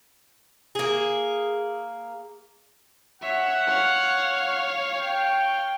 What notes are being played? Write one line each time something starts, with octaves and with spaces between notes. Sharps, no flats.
A#3 G#4
C#5 E5 F#5
C#5 F5
G5